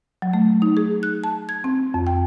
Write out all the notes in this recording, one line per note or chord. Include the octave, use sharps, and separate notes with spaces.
F#3
A3
D#4
G#4
F#6
A5
G#6
C4
F2
G5